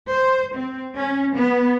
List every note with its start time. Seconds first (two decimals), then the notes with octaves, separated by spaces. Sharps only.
0.11 C5
0.55 C4
0.94 C#4
1.33 B3